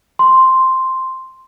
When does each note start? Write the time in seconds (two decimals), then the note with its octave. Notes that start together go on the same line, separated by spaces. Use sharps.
0.19 C6